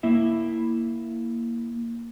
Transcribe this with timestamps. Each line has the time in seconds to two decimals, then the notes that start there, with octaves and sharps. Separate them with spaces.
0.03 A#3 E4 E5